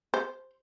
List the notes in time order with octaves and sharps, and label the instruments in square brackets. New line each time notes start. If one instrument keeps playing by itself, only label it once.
[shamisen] C5